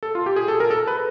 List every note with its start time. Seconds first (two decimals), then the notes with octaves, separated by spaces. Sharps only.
0.03 A4
0.15 F4
0.26 G4
0.36 G#4
0.48 A4
0.60 A#4
0.70 A4
0.87 B4